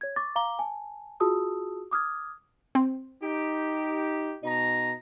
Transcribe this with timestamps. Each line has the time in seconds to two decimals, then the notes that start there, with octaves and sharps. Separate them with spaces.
0.01 C#5 G#6
0.16 C#6 D6 A6
0.36 F5 A#5 D6 G7
0.59 G#5 A5
1.20 F4 F#4 G#4 A5 D#6 E6
1.91 D6 D#6 F6 G#6
2.75 C4
3.21 D#4 G4
4.44 B2 D#4 A#5